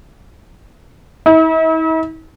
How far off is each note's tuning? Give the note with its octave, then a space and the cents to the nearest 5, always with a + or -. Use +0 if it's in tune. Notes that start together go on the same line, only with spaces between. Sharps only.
E4 -45